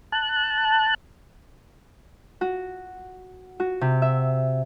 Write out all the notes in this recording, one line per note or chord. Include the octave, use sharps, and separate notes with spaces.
A5 F#6
F#4
F#4
C3
E5